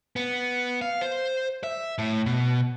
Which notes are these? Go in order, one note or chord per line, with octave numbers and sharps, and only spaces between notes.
B3
F5
C5
E5
A2
B2